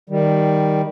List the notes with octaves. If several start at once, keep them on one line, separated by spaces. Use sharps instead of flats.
D#3 G3